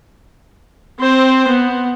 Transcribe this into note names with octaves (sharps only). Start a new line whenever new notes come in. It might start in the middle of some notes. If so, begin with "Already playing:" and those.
C4 C5
B3